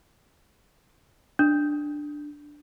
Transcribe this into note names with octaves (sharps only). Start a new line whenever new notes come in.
D4